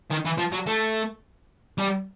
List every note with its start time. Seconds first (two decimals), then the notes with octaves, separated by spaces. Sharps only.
0.10 D#3
0.25 E3
0.38 F3
0.52 F#3
0.67 A3
1.78 G3